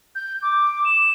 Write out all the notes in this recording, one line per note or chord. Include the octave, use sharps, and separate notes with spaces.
G6
D6
E7